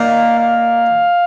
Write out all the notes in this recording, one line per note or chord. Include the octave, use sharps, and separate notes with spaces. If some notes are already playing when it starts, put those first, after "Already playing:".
Already playing: A#3 D#4 D5 F5
F5